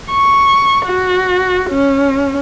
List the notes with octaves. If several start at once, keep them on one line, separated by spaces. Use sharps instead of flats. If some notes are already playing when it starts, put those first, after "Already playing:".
C#6
F#4
C#4